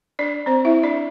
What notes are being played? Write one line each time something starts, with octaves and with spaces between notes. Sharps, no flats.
D4 D5
C4 C5
E4 E5
D4 D5